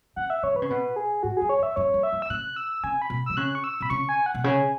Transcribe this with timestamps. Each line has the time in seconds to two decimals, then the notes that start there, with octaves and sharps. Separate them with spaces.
0.16 C#3 F#5
0.30 E5
0.43 C#3 C#5
0.55 E3 B4
0.62 C#3
0.69 B2 B4
0.96 G#4
1.23 G#2 F#4
1.37 F#2 G#4
1.49 C#5
1.59 F#2
1.63 E5
1.76 F#2 C#5
1.94 F#2
2.03 E5
2.12 F#2
2.22 E6
2.30 C#3 F#6
2.56 E6
2.84 C#3 G#5
3.02 B5
3.10 B2
3.26 E3 E6
3.37 C#3 F#6
3.55 C#6
3.64 E6
3.80 B2 B5
3.90 C#3 C#6
4.09 G#5
4.26 F#5
4.34 B2
4.44 C#3 G#5